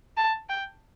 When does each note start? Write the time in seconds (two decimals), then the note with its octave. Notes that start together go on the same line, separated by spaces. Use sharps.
0.17 A5
0.49 G5